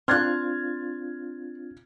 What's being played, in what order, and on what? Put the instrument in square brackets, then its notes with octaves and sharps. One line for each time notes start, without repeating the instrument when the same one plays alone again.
[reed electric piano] C4 D4 F4 [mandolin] C6 F#6 [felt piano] F6 G#6 A6